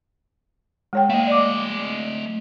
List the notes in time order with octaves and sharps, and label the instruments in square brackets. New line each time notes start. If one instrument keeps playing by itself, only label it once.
[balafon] G#3 C#5 G5
[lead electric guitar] A3 D#5 [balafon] A#3 F5
[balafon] D5 D6